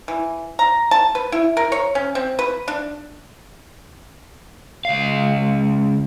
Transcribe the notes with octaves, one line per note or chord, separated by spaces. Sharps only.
E3
A#5
A5
B4
E4
A#4
C#5
C#4
C4
B4
D4
C#2 F5